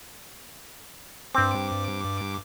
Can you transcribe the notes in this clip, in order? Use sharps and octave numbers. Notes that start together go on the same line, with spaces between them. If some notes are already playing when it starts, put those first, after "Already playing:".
G2 C4 D6